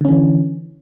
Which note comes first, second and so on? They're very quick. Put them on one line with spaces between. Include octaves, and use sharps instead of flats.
D3 C#4 E3